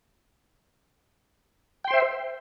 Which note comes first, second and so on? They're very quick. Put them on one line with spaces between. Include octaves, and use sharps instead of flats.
G5 C6 C5 E5